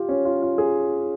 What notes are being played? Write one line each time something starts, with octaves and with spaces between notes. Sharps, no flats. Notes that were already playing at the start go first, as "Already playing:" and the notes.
Already playing: F4 G4
C#4
F4
F4
G#4